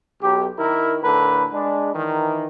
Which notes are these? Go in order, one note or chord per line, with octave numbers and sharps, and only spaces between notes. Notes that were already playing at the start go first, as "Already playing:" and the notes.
B1 G4
D#3 E4 A#4
A2 D3 A#4 B4
G#3 D4
D#3 E3